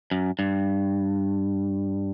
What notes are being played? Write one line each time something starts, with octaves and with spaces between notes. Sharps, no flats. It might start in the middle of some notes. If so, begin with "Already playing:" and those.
F#2
G2